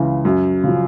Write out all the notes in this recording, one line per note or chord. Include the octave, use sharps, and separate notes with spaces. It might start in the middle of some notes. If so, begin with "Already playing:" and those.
Already playing: C#2 C#3 E3
F#2
C#3 F3